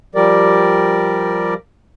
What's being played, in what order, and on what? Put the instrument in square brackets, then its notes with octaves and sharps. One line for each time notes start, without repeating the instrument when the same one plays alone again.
[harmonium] F3 G3 G4 A#4 D5